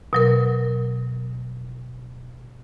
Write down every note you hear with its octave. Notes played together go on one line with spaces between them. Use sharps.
B2 F#3 A#4